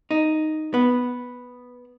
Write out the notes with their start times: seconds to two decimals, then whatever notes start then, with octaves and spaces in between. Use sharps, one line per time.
0.11 D#4
0.74 B3